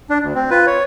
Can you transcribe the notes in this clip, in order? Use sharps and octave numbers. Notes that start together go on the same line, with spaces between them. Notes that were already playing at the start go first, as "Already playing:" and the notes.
D4
D2
C4
F4 B4
C#5